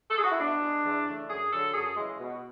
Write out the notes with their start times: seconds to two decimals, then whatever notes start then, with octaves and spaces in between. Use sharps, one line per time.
0.10 A4
0.17 G#4
0.24 F#4
0.32 E4
0.39 B2 D4
0.62 G#3
0.85 E2
1.07 C#3 E3 A3
1.29 F#2 G#4
1.52 D3 F#3 A4
1.74 F#2 G#4
1.97 C#3 E3 G#3
2.20 B2